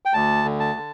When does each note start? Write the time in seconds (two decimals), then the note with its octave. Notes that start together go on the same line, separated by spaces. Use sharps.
0.05 G5
0.14 D2 A5
0.45 D3
0.60 A5
0.76 D3